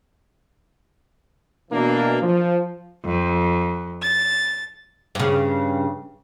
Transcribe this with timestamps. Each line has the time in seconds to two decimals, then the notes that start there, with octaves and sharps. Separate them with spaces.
1.71 B2 E3 A#3 D4
2.22 F3
3.04 F2
4.01 A6
5.15 G2 C#3